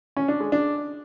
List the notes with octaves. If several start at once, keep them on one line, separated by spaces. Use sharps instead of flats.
C#4
D4
G#3
D4